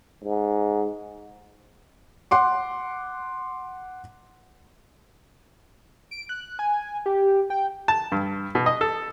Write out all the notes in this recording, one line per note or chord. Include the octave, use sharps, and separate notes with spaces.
G#2
F#5 C6 D6
D7
F#6
G#5
G4
G5
A5
G2
B2
D#5
A4